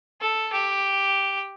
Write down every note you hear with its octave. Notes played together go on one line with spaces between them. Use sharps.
A4
G4